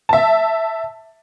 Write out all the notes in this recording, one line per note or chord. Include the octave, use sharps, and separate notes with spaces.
E5 A5